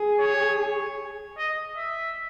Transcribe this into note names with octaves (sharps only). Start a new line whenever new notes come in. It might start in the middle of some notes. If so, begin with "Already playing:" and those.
Already playing: G#4
C#5
D#5
E5